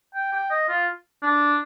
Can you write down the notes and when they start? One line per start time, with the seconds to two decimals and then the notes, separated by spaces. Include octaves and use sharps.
0.14 G5
0.32 G5
0.50 D#5
0.68 F4
1.22 D4